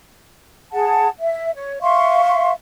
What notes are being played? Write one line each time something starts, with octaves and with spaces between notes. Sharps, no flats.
G#4 F#5 A5
E5
C#5
E5 F5 C6 C#6